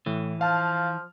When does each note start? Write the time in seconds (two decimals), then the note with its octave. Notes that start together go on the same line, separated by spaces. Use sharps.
0.06 A2 E3
0.41 F3 F5 A5 F6